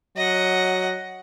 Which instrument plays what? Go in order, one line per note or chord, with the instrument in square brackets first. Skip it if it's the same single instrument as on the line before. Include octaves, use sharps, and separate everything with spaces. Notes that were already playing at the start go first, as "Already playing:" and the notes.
[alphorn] F#3 [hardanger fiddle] D#5 F#5